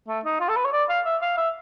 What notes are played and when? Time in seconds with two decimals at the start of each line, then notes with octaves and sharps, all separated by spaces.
0.08 A3
0.25 D#4
0.40 F4
0.49 A4
0.56 B4
0.64 C#5
0.73 D5
0.89 F5
1.05 E5
1.22 F5
1.37 E5